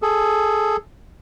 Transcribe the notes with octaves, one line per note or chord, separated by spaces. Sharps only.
G#4 A4